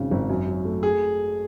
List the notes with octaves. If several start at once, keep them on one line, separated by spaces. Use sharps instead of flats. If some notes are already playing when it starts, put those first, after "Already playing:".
Already playing: G#1 C#3
G#1
F#2
F#3
A3
G#4